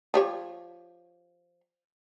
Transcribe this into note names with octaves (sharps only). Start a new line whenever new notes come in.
F3 G4 C#5